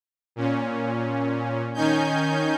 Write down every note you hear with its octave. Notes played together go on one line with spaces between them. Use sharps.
A#2 C#4
D#3 C#4 D#4 G#5 G6